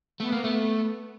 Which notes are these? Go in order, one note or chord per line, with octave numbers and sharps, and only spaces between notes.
A3 B3
A#3
A3